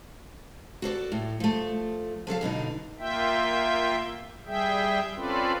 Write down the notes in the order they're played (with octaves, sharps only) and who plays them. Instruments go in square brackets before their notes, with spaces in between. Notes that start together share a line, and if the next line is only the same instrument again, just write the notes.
[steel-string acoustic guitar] F#4 A4 C5 D5
A2
F3 A3
F3 F#3 A4 F5
F#2 B2 D3 D#4
[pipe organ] A#3 F4 E5 G5
G3 G#4 E5 G5
C4 C#4 F4 A4 B4 D5